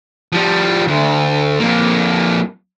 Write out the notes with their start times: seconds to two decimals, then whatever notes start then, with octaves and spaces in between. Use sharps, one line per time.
0.32 F3 G3
0.88 D2
1.60 F2 A#3